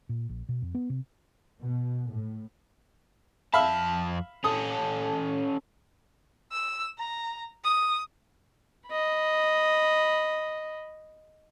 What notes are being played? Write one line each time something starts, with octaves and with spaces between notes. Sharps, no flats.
A#2
A#1
B2
F2
B3
C3
B2
A2
F2 E5 F5 A5 B5
C#4 A4 D#6
E6
A#5
D#6
D#5 B5